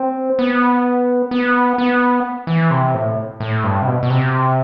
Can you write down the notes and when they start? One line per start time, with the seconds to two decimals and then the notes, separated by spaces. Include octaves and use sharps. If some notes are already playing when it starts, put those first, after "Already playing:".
Already playing: C4
0.39 B3
1.31 B3
1.78 B3
2.47 E3
2.71 C3
2.94 A2
3.40 A2
3.64 G2
3.82 C3
3.87 B2
4.03 B2
4.10 C3